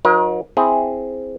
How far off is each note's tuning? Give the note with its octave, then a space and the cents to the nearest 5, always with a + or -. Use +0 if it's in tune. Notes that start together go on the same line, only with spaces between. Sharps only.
F#3 -40 D#4 +0 A#4 +40
C4 +0 E4 +0 G#4 +0